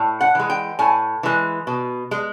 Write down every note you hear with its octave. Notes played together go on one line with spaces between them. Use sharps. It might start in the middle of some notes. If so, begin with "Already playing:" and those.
Already playing: A2
F#5
E3 G#3
G5
A2 G#5
E3 G#3
B2
G#3